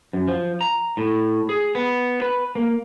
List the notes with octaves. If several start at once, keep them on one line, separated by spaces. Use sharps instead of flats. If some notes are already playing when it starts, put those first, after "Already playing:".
F#2
F3
A#5
A2
G#4
B3
B4
A#3